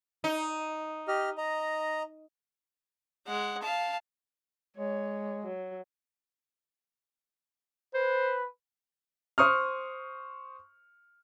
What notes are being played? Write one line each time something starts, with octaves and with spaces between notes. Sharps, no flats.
D#4
G4 D#5 F6
D#5 A#5
G#3 F#5
F5 A5
G#3 C#5
F#3
B4 C5
C5 C#6 D#6 F6